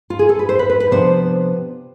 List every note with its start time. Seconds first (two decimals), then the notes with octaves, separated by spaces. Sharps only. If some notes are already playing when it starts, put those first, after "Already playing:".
0.10 F4
0.19 G#4
0.29 A4
0.39 B4
0.49 C5
0.59 B4
0.70 B4
0.80 B4
0.91 C3 F3 B3 D4 C5